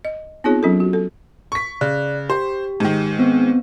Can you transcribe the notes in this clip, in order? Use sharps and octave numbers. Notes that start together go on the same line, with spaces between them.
D#5
B3 C4 D#4 F4 G#4 C#5
F#3 C#4 F4 A4
F#4
A4
C#6 B6
C#3 D5 F#6
G4 C5
G#2 D#3
B3 C4